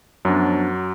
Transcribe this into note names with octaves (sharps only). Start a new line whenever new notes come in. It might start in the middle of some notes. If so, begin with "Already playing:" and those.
F#2 F3 F#3 B3 D4